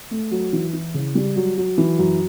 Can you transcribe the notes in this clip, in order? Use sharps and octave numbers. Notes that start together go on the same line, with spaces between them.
A3
F#3
E3
E4
C#3
G3
F#3
F#3
E3
F#2